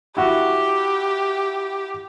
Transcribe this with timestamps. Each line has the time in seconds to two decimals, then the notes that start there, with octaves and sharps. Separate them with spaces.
0.17 E4 F#4 G4